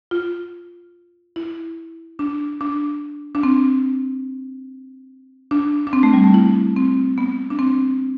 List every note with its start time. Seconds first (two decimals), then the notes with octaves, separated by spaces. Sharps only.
0.11 F4
1.36 E4
2.19 D4
2.61 D4
3.35 D4
3.43 C4
5.51 D4
5.87 D4
5.93 C4
6.03 A3
6.13 G3
6.24 A3
6.34 E4
6.76 C4
7.18 B3
7.50 D4
7.59 C4